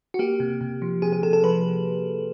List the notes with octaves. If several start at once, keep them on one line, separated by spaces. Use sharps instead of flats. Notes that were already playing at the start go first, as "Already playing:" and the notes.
F#4
A#3 G4
C3
C3
F3
C3 G#4
G#4
C3 A4
A4
F3 B4